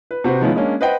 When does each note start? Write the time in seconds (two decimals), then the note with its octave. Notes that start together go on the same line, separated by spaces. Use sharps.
0.11 B4
0.24 C3 F#4 B4 C5
0.41 D#3 F3 G#3 B3 C#4 E4
0.56 G#3 A#3 C#4 D4
0.81 B4 C5 D#5 F#5 G5